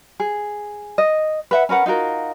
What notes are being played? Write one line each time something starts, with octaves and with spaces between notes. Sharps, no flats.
G#4
D#5
B4 E5 F#5
C#4 A#4 B4 F#5
D#4 F4 F#4 A#4